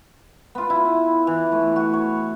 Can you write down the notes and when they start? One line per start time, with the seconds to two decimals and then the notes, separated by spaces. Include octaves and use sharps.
0.55 B3 F4
0.70 E4
1.27 E3
1.52 A3
1.76 F#4
1.93 C#5